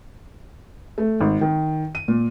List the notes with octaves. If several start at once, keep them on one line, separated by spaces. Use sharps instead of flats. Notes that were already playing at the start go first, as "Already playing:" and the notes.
A3
G#1
D#3
D#7
A#2